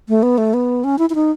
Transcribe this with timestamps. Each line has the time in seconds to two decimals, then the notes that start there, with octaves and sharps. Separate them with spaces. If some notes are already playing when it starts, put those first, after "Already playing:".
0.09 A3
0.23 B3
0.38 A3
0.54 B3
0.84 C#4
0.99 E4
1.10 E4
1.15 D#4